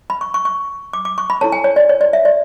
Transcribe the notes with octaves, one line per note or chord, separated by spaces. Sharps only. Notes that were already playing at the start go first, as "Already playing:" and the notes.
B5
C#6
C#6
C#6
D6
D6
C#6
B5
E4 A4 C#5 A5
G#5
C#5
D5
C#5
D5
E5
D5